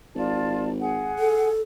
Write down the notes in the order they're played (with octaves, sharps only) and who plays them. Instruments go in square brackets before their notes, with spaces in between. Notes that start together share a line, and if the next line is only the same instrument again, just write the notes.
[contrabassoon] G#1 [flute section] F4 D5 A5
[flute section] G#4 F#5
[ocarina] A4